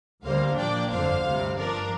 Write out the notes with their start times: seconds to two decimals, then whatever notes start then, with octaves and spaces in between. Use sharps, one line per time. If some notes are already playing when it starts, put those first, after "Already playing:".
0.23 D2 D3 G3 A#3 C5 F5
0.57 A#2 F3 A#3 D4 D5 G5
0.90 G1 F2 D3 C5 F5
1.24 D2 C3 G3
1.57 G2 F3 D4 A#4 D5